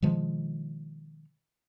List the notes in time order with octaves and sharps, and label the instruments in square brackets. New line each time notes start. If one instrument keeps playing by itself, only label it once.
[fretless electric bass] B2 D#3 F3 G#3